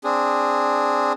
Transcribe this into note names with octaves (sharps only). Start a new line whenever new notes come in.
C4 D4 G#4